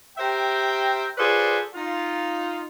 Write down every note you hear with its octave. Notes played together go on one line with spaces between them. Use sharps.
G4 A#4 C5 E5 G5
F4 G#4 A4 B4 C5 D5
D#4 F4